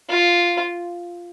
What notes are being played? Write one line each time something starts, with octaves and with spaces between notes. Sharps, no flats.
F4